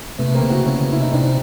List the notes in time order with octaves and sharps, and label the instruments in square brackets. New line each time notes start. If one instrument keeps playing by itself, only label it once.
[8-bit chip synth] C3 [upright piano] A3 B3
[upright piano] A#3 C4
[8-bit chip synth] C#3
[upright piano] E4 F#4
[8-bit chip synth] C#3 [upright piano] B3 C#4
[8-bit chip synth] C#3
[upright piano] E4
[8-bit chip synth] C3 [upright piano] D#4
[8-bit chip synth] C3 [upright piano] C4 D4